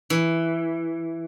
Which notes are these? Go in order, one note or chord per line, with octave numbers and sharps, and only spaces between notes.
E3